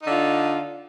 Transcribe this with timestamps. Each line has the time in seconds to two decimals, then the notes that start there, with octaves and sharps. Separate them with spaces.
0.03 D#4
0.06 D3
0.10 F4